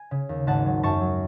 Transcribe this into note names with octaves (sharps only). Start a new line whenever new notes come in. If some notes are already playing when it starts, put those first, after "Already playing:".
Already playing: G#5
C#3
D#2
G#1 F#5 A5
F#3
F#2 A5 C#6
F#3